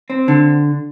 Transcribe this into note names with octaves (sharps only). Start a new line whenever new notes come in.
C4
D3